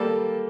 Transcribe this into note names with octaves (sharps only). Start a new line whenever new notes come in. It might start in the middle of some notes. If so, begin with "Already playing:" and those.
Already playing: G3 A#3 A4